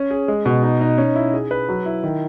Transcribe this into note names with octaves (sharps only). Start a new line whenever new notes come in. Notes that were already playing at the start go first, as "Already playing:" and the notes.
Already playing: C#4
G#4
G#3
B2
D#4
D#4
C#4
E4
G#4
B4
F#3
E4
D#3